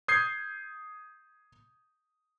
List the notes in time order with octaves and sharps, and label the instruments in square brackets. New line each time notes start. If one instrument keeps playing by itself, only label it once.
[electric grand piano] D#6 G6 G#6 C7